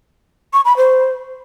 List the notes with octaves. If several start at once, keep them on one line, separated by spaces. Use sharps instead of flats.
C#6
B5
C5